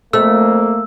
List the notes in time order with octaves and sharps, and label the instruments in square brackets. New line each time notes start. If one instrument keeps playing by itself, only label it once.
[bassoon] F2 [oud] A3 [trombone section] A#3 [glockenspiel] E6